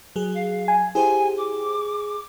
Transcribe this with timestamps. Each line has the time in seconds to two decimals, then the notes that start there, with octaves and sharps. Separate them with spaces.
0.16 F#3 G#4
0.34 F5
0.68 G#5
0.95 E4 G4 G#4 C5 G#5
1.36 D6